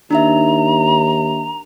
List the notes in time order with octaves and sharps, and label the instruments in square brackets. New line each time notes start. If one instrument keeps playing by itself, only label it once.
[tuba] D#2 [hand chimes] D4 D#4 E5 [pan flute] A#5